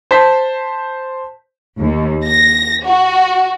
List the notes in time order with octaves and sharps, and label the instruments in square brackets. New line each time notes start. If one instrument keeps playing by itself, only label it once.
[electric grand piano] C5 A5 C6 G6 B6
[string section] D#2
A#6
F#4